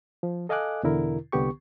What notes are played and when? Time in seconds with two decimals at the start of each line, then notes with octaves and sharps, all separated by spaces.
0.23 F3
0.49 A4 D#5 F5 G#5 D6 F#6
0.83 E2 B2 D3 E4 A#4
1.32 C2 D3 B3 G4 C#6